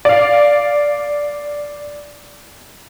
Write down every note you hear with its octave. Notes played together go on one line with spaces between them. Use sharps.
D5 F5